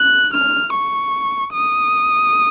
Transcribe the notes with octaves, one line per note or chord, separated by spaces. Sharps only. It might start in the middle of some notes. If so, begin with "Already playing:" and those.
Already playing: F#6
F6
C#6
D#6